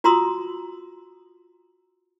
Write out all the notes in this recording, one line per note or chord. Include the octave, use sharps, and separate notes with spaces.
F4 F#4 A#5 C6 D#6 E6